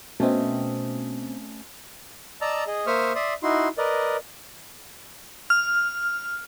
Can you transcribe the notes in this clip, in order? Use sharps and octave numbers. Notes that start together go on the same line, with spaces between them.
B2 A3 C4 C#4 D#5
D5 D#5 A5 A#5 E6
G#4 D#5
A#3 C5 E5 C#6 D#6 F6
D5 E5 C6 D#6
D#4 E4 F#4 C6
A#4 B4 D5 D#5
F6